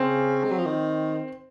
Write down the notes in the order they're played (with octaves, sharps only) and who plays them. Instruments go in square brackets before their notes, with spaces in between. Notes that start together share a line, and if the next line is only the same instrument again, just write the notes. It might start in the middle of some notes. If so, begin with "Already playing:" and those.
Already playing: [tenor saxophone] C#3 [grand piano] C4
[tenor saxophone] G#3
F#3
F3
D#3